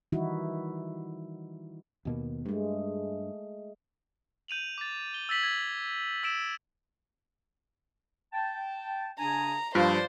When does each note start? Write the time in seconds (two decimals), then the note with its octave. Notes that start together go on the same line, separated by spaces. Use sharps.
0.12 D#3 E3 G3 D#4 E4 F#4
2.05 D#2 B2 A#3
2.46 G2 G#3 A3
4.48 G6 D#7 F7 F#7
4.78 D6 A6
5.14 G7
5.29 E6 A6 B6 F#7
5.43 G#6
6.23 E6 D7 E7
8.33 G5 A5
9.19 C#3 D4 G#5 A#5
9.75 G2 F3 F4 C5 D5 A5